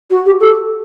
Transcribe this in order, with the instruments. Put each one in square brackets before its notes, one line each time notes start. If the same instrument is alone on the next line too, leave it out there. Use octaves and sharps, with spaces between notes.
[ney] F#4
G4
A4